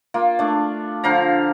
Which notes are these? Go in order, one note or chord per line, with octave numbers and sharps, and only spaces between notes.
A#3 F4
A3 D4
D3 F3 F5 A#5